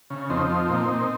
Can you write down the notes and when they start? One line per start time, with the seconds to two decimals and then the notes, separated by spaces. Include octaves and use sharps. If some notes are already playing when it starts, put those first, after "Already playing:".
0.10 C#3
0.30 F2 C4 D#4
0.50 F3
0.69 A#2
0.89 A#2